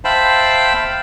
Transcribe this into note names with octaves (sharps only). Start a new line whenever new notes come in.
C5 E5 F5 G5 A5 B5